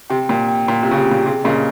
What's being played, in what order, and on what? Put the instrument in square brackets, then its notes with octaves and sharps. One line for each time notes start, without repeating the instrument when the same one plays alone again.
[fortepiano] C3 [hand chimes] G5
[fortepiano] A#2 [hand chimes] G5
[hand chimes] G5
[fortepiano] A#2 [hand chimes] G5
[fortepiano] C3
[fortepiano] C#3 [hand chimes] F4
[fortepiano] C3
[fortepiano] A#2 [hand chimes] G5
[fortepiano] C3 [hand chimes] G#4
[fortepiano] A#2 C#3 [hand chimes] D#5